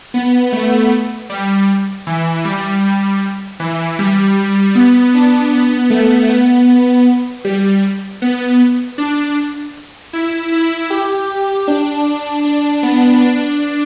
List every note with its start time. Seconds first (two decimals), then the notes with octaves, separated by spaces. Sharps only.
0.14 B3
0.53 A3
1.30 G3
2.07 E3
2.45 G3
2.84 G3
3.60 E3
3.99 G3
4.75 B3
5.14 D4
5.53 B3
5.90 A3
6.29 B3
7.45 G3
8.22 B3
8.98 D4
10.13 E4
10.52 E4
10.90 G4
11.68 D4
12.44 D4
12.83 B3
13.21 D4